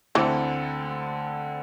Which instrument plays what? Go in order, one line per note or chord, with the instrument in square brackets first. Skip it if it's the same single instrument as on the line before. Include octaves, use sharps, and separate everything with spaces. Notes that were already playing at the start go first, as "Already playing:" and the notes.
[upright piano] D2 D3 C4 A4 [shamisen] E3